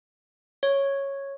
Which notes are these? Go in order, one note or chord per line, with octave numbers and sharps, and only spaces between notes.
C#5